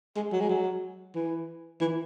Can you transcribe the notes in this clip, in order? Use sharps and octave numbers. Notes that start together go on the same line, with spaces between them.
G#3
F#3
G#3
F#3
E3
E3